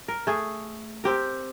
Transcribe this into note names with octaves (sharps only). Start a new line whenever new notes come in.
A#4
A3 G#4
C4 G4 A#4